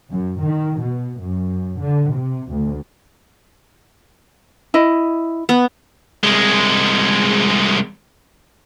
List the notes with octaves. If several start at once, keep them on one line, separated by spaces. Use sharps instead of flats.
F#2
D#3
B2
F#2
D3
C3
D2
E4 D#5
B3
C2 G#3